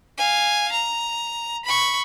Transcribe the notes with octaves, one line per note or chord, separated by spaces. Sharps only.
F5 G#5
A#5
B5 C#6